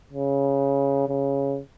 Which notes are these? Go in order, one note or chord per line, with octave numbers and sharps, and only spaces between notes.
C#3
C#3